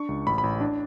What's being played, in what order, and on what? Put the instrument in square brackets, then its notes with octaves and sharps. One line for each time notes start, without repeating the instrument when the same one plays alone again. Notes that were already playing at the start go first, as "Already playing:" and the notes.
Already playing: [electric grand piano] D4 C#6
C#2
A1 B5
B5
A1
D4